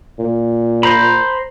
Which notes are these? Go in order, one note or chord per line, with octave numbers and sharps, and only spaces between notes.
A#2
C5 A#5 B5